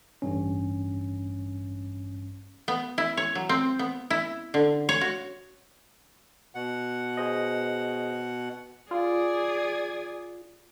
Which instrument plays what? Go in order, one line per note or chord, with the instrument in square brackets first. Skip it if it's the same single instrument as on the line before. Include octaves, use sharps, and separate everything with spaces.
[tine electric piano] A1 G2 C#4
[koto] B3
E4
C#5
F#3
C4
B3
E4
D3
C#5
F#4
[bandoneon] B2 F#5
[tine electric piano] G#4 C5 D#5
[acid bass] F4 [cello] G#4 D5